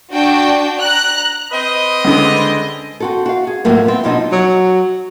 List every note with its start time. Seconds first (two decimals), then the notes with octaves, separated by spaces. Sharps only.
0.12 D4 F#4 G5
0.81 A#5 F#6
1.52 C4 B4 D#5
2.05 C#2 D3
3.00 C4 F#4 A4
3.26 F#4 F5
3.47 G#4
3.65 A2 F3 F#3 A3 A#3
3.86 B3 C4
4.04 F#2 B2 F3 D4 D#4
4.32 F#3